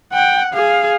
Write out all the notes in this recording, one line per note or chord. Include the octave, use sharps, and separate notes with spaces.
F#5 G5
G#4 F5